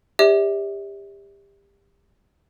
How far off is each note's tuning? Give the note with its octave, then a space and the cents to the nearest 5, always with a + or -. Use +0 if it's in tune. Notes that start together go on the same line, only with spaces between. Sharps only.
G4 +25 C#5 +45 E5 -35